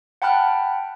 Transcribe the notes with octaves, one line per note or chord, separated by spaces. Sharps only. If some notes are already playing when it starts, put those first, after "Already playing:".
F#5 G5 A5 B5 F6 F#6